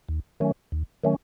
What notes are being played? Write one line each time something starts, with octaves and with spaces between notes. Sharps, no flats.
D#2
D#3 F#3 A3 C#4
D#2
D#3 F#3 A3 C#4